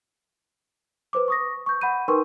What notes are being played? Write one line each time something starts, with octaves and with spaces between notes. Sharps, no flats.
B4 C5 D6
C#6 D#6 A#6
C#6 G6
F#5 B5 G6 D#7
D#4 A#4 B4 G5 C6 C#6